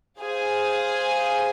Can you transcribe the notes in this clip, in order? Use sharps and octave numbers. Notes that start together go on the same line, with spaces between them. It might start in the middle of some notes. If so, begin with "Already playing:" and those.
G#4 C5 F5 G#5